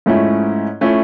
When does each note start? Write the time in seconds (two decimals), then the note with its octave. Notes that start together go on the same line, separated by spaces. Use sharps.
0.06 G#2 F3 A3 C#4 E4
0.81 F3 A3 C#4 E4